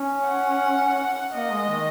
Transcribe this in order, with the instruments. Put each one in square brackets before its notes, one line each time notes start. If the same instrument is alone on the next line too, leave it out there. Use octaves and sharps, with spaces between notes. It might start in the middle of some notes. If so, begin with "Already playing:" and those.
Already playing: [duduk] C#4
[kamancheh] F#5
[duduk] A#3 [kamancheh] D#5
[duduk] G#3
D#3